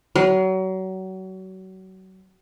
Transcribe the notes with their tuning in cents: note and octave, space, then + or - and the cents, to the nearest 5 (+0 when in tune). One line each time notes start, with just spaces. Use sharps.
F#3 +30